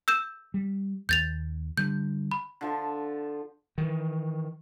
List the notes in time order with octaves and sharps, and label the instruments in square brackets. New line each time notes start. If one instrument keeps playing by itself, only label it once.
[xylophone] E6 G6 E7
[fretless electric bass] G3
[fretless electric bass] D#2 [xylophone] G6 A6 F7
[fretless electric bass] D3 G3 [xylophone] G6
[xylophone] B5
[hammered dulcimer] D3 F3 A5
[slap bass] D#3 E3